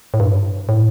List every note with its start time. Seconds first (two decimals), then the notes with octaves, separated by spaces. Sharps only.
0.14 A2
0.20 G2
0.69 A2